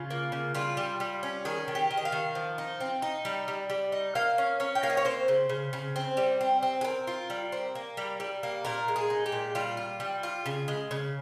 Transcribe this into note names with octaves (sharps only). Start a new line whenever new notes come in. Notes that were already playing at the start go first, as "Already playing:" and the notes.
Already playing: C#3 F4
A#3
C#3
G3 F4
G3
G3
C#4
D#3 G#4
D#3
G4
D#3
D#5
F5
D#3
F3
D#4
C4
D#4
G3
G3
G3
D#4
A#3 F5
C#4
C#4 C#5
G5
A#3 F5
D#5
C#5
C4 C5
C#3
C#3
C#3
C4
G3
C4
C4
G#4
C4 A#4
F4
G3
C4
A#3
G3
G3
A#3
A#2 A#4
G#3
G#4
D#4
G4
A#2
G3 F4
F4
G3
F4
C#3
G#3
C#3